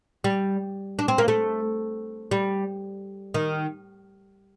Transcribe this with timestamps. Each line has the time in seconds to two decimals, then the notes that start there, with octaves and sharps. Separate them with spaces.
0.24 G3
0.99 D4
1.08 C4
1.18 A#3
1.28 A3
2.31 G3
3.34 D#3